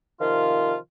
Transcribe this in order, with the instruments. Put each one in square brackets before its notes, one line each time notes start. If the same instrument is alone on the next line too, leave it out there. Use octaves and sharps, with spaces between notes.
[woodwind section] C3 D#3 F3 F4